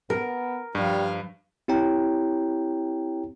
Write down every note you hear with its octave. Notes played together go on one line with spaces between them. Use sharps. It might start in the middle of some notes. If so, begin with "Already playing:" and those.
B3 A#4
G2 F3 G3 F5
C4 E4 G4 C#5 G5 A#5